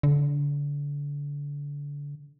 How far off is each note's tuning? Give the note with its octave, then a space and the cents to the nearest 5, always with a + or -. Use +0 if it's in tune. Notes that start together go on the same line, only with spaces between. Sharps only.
D3 -30